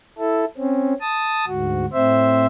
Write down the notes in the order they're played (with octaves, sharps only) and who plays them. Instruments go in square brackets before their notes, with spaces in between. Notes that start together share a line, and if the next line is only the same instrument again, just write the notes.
[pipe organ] E4 A4
C4 C#4
A5 D#6
D2 G#2 F#4
A2 C4 C5 E5